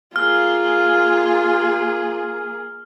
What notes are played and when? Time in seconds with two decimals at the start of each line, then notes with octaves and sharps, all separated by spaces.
0.16 A#3 F4 G#4 F6